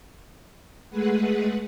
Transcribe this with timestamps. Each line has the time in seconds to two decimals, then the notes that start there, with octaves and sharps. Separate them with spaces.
0.90 G#3 A3 G#4 B4 F#5